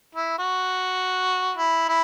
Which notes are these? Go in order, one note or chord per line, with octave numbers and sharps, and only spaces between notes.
E4
F#4
E4
E4